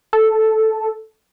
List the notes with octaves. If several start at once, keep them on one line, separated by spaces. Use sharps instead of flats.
A4